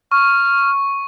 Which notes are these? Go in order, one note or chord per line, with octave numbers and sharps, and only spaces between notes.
C#6 F6